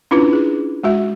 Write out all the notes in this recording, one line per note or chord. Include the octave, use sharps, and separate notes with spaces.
C#4 D4 E4 F4 B4
G#4
G#3 F#4 E5